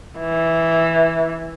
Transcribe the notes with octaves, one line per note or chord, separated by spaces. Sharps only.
E3